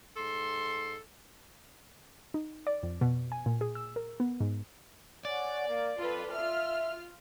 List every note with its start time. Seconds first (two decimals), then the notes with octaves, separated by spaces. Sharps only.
0.16 G#2 A4 C6
2.34 D#4
2.67 D5
2.83 F2
3.01 B2
3.32 G#5
3.46 A#2
3.61 G#4
3.75 E6
3.96 A#4
4.20 B3
4.40 G#2
5.25 C#5 D5 F#5 G#5
5.68 A#3
5.99 F2 F4 A4 B4
6.33 F4 E5 F6